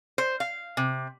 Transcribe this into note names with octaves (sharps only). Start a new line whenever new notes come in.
C5
F5
C3